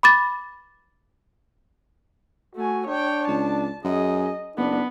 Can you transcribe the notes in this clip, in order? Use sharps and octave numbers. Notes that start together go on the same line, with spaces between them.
B5 D6 A6
A3 F#4 G#5
D4 C#5 G5
C#2 A5
F#2 G#4 D#5
F#1 B3 D4